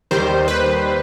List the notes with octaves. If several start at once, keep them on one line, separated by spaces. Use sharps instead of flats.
D#2 D#3 G3 C5
B4